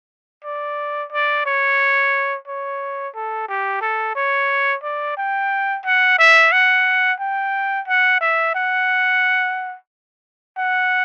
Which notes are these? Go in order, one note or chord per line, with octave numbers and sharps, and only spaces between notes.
D5
D5
C#5
C#5
A4
G4
A4
C#5
D5
G5
F#5
E5
F#5
G5
F#5
E5
F#5
F#5